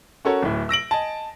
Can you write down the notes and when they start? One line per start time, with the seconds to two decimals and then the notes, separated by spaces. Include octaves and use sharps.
0.25 C#4 F#4 A4 A#4 C#5
0.42 D1 A2
0.69 E6 A#6 D7 F#7
0.91 D#5 G#5 A5